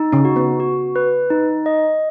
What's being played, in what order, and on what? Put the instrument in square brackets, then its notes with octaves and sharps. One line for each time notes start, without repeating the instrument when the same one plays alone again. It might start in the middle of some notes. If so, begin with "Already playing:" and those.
Already playing: [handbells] D#4
[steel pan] C#3 C#4
[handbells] F#4
[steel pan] B3
[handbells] F#4
B4
D#4
D#5